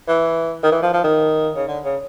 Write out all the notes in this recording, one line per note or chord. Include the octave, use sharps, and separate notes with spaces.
E3
D#3
E3
F3
F3
D#3
C#3
D3
C#3